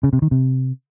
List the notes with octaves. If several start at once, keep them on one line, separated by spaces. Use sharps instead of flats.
C#3
C3
D#3
C3